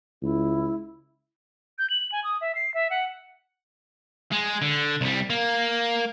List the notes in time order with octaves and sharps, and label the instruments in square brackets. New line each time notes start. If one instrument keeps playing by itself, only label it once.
[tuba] C#2 [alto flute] E4
[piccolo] G6
F#7
G#5
D#6
E5
C7
E5
F#5
[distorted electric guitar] G#3
D3
C2 G3
A#3